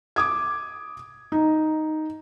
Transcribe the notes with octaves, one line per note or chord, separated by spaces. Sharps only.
D6 D#6 G#6
D#4